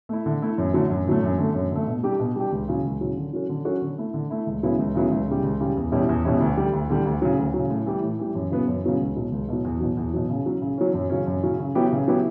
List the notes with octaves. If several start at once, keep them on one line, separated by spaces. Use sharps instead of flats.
A3 E4
D3
A3 E4
F#2
D3 F#3 A3
F#2
D3 F#3 A3
F#2
D3 A3
F#2
D3 A3
B2
G3 D4 G4
B2
G3 D4 G4
C#2
C#3 F#3
C#2
C#3 F#3
D3
F#3 C#4 F#4
D3
F#3 C#4 F#4
D3
A3 E4
D3
A3 E4
C#2
C#3 F#3 B3 E4
C#2
C#3 F#3 B3 E4
C#2
C#3 G3
C#2
C#3 G3
E2
B2 G3 C#4 E4
E2
B2 G3 C#4 E4
D2
D3 G3
D2
D3 G3
D2
C#3 F#3
D2
F#3
C#3
A2
E3 G3
A2
E3 G3
F#2
C#3 F#3 B3
F#2
C#3 F#3 B3
C#2
B2 F#3
C#2
B2 F#3
E2
B2 F#3
E2
B2 F#3
C#3
F#3 C#4
C#3
F#3 C#4
F#2
C#3 F#3 C#4
F#2
C#3 F#3 C#4
C#3
F#3 B3 E4 G4
C#3
F#3 B3 E4 G4